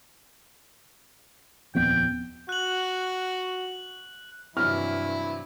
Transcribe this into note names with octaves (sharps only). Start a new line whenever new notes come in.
D#1 F2 B3 G5
F#4 F#6 F#7
G2 C3 E3 F#3 E4 F6